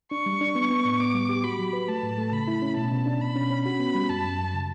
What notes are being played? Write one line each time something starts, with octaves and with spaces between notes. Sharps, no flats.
D4 C#6
G3
D4
B3
B3
A2
B3 D6
G3
G4
F#4 B5
F#3
B4
A3 A5
A2
A3
C#3 B5
E4
C#4
B2 A5
B2
D4
B2 B5
C#4
C#4
F#4 B5
B3
G3
F#2 A5
F#2
F#2
C#3